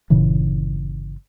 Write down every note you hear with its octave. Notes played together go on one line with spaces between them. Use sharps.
G1 A#2 C#3 E3